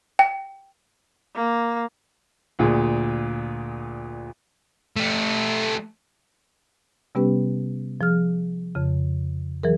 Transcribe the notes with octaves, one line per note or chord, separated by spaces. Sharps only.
G5
A#3
D2 A#2 G#4
A3 G4
C3 G3 B3 C#4 G4 B4
F3 G#4 F6
F2 C#3
E3 F#3 G#4 A#4